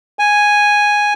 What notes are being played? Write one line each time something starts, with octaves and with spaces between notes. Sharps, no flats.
G#5